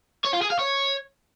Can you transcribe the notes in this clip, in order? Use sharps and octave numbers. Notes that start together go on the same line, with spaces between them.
C#5
F4
G#4
F5
C#5